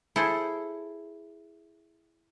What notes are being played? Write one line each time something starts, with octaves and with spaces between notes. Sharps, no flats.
E4 G#4 A4 C5